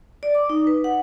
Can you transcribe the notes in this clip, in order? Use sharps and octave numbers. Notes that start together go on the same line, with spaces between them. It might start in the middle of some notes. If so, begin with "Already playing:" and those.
D5
D6
D#4
B4
F#5